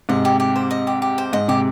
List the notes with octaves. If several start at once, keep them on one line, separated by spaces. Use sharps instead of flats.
G#2 C3 D#5
G4
G4
C5
D#5
G4
G4
C5
G#2 D#5
C3 G4